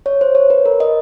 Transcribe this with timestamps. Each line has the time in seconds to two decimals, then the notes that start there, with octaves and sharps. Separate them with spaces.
0.06 C#5
0.21 C5
0.35 C#5
0.50 B4
0.66 A#4
0.80 D#5